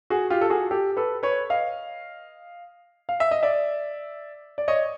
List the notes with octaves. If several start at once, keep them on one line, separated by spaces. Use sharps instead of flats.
F#4 G#4
F4 G4
A4
F#4 G#4
G4 A4
A4 B4
B4 C#5
D#5 F5
F5
E5
D#5
D5 E5
D5
C#5 D#5